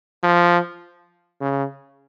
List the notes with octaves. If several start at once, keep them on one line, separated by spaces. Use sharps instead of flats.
F3
C#3